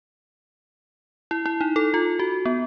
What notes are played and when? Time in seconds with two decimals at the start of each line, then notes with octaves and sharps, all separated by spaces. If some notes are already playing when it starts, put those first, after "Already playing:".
1.31 E4
1.46 E4
1.61 D#4
1.76 A4
1.94 F4
2.19 F#4
2.46 B3